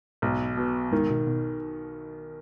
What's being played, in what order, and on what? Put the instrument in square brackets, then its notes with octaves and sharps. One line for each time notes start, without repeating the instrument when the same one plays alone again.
[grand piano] B1 [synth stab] G#2
[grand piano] B2
[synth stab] G#2 [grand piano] D#3
[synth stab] B2
B2